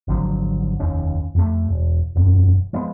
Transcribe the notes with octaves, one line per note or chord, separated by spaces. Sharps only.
G#1 D3 F3 F#3
F1 D#2 C#4
F2 A3
E1
E1 F#2
F3 G#3 B3